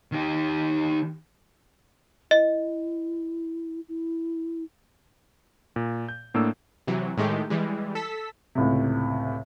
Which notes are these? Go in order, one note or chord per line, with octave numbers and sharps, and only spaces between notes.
D#3 G4
E4 D#5
E4
A#2
G6
A2 A#3 D4 E6
C3 E3 F#3
A2 D#3 G#3 A3 G4
E3 G3 G#3
A4 E6 B6
C#2 A2 C3